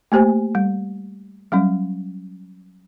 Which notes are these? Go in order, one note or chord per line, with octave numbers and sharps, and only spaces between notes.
A3 A#3 G4 C5 G#5
G3
F#3 G3 C#4